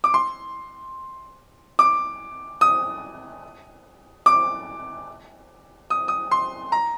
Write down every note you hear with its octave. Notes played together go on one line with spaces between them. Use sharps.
D6
C6
D6
D#6
D6
D#6
D#6
C6
A#5